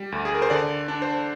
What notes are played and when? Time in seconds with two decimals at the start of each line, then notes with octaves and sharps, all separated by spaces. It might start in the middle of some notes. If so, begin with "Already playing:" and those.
Already playing: G3
0.12 D2
0.25 G#4
0.34 A#4
0.42 C5
0.50 D3 D5
0.88 D4
1.02 C5